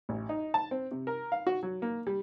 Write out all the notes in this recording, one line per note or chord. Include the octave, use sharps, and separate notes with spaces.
A1
D#4
A5
C4
C3
A#4
F5
F#4
F#3
A#3
G3